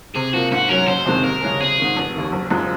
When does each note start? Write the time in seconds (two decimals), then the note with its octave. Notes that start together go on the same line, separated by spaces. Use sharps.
0.15 C3 G#4
0.34 F3 A#3 F#4
0.52 G#2 F#4
0.70 F#3 C#4 A#4
0.87 F#1 C5
1.06 F2 C3 D#3 G#3
1.24 D#2 A#4
1.42 C#3 G#3 C#4 G#4
1.60 G#1 G#4
1.78 G#2 D#3
1.96 F1
2.14 D#2 D#3
2.32 F#1
2.50 F#2 F3 G#3